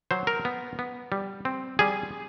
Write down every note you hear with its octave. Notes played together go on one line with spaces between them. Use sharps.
F#3 C5
A#4
B3
B3
G3
C4
G3 G#4